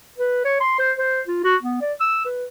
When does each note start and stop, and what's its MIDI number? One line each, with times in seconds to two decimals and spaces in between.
0.18 0.43 71
0.45 0.57 73
0.61 0.78 84
0.79 0.92 72
0.98 1.21 72
1.27 1.44 65
1.44 1.56 66
1.63 1.79 59
1.81 1.93 74
2.00 2.21 88
2.25 2.45 71